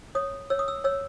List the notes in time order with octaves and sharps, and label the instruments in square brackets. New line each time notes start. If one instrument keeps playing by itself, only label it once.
[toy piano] C#5 D#6
C#5 E6
D#6
E6
C#5 E6